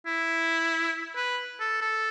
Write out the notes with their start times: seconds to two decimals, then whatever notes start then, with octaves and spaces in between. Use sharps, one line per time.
0.06 E4
1.16 B4
1.60 A4
1.81 A4